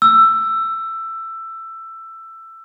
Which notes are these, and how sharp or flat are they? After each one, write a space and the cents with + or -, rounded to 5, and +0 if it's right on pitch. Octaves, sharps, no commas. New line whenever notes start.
E6 +15